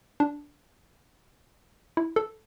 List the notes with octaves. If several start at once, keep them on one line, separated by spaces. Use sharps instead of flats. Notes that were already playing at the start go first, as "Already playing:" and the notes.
D4
E4
A4